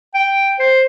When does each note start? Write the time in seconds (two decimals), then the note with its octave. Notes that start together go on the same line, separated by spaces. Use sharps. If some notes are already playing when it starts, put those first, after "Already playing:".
0.14 G5
0.59 C5